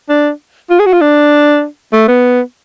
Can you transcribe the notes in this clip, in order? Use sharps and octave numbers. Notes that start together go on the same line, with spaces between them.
D4
F4
G#4
F#4
F4
D4
A3
B3